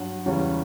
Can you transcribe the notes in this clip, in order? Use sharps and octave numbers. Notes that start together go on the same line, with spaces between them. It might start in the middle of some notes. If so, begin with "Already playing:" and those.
Already playing: G2 F#3 F#5
E2 C#3 G3 C#4